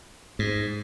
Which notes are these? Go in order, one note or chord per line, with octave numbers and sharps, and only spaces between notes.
G#2